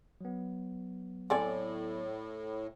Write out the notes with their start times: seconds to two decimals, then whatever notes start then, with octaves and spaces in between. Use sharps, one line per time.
0.21 F#3 B3
1.30 A2 C4 A4 D5 G#5